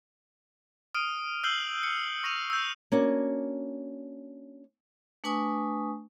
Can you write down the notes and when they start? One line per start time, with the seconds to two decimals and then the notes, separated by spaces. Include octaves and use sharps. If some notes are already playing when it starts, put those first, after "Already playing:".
0.95 D#6 F6 D7 D#7
1.43 E6 F6 G6 C7 F#7 G7
1.83 C#7
2.24 C#6 A#6 C#7 D#7 F7
2.50 E6 G6
2.92 A#3 C#4 D4 F#4
5.24 A3 D4 B4 G#5 C#6 D#6